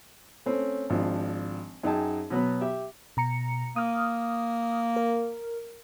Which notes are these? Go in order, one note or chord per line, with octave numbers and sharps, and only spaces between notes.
A3 C4 C#4
G#1 F3 D4
F#2 D#4 G#4 D#5 G5 A5
B2 F#3 B3
G4 E5
B2 A#5 C#7
A#3 D#6 F6
A#4